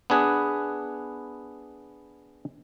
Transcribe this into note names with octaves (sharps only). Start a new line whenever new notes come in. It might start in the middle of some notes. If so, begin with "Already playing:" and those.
B3 D4 G#4 B4